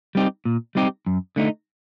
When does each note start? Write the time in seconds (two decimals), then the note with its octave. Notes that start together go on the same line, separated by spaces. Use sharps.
0.15 G3 C4 D#4 G4
0.45 A#2
0.75 G3 C4 D#4 G4
1.06 F#2
1.36 D3 A3 D#4